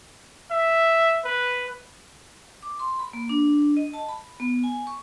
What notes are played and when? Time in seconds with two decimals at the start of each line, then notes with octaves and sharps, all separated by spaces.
0.51 E5
1.24 B4
2.63 D6
2.80 C6
2.99 B5
3.13 A#3
3.29 D4
3.77 D#5
3.94 A5
4.09 B5
4.40 B3
4.64 G#5
4.87 C#6